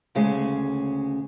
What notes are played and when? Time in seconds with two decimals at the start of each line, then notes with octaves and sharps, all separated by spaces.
0.15 D2 C#3 G#3